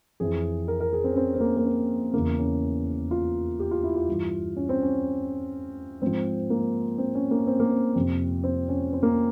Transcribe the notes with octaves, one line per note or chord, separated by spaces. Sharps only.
F2 E3 G#4
A#4
A#4
G#4
C4
C#4
C4
C4
A#3
A#3
C4
E2 C#3 E3 A#3
C#4
F4
G4
F4
E4
F4
G2 E3
C#4
C4
C#4
G#2 F3 C4
A#3
C4
C#4
A#3
C4
A#3
C4
F2 C3 F3
C4
C#4
C4
A#3